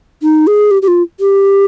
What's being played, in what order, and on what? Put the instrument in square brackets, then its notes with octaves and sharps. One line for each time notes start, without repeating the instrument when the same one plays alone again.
[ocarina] D#4
G#4
G4
G4
F4
G4